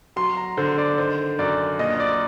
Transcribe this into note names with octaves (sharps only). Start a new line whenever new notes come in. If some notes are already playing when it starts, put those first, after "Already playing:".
F#3 C6
A#5
D3 C5
D5
D#3 C5
F#2 D5
A#1 D#5
D5